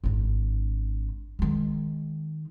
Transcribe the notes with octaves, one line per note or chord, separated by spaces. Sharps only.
G#1 D4
D#3 G#3